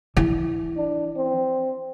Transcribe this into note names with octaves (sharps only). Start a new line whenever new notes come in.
E3
D4
C4